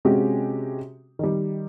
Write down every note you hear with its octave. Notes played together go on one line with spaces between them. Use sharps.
C3 G#3 C#4 F#4 G4
D#3 G3